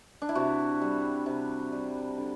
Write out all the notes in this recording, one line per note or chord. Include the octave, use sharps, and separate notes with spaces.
D4
E4
C3 F#4
G3
C3
G3
D3